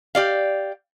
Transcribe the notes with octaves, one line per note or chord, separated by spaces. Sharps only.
G4 D5 F5